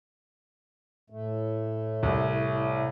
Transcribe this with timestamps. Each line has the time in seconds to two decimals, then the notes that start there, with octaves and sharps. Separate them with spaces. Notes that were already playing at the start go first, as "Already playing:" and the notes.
1.10 A2 A3
2.03 C2